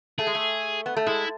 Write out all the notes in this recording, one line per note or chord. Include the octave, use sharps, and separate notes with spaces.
A3 G#4
G#3
A3
B3
A3
G#3 E4